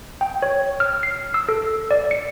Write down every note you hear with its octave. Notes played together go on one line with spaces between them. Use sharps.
G5
C#5
F6
C7
E6
A4
D5
C#7